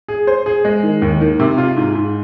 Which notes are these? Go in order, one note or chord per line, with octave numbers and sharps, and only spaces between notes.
G#4
C5
G#4
G#3
D#3
D#2
D#3
C3
F4
G#2
G#2